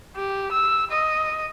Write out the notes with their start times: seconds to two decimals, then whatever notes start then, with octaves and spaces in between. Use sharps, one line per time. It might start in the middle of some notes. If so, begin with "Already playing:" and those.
0.16 G4
0.52 E6
0.91 D#5